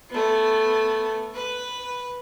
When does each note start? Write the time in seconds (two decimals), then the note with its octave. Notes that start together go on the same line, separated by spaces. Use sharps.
0.10 A3 B3
1.34 B4